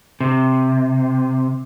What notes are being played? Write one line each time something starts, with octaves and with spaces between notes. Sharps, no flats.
C3